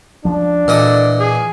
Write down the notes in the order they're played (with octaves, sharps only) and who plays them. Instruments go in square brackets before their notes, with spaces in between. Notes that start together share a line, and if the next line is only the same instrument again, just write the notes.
[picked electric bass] C#2 F3 [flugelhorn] D4
[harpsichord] A#2 D#5 D6 [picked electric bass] E3 [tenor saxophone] A4
[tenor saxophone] G#4